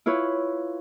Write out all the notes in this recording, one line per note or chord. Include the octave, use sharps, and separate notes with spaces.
E4 F4 B4 C#5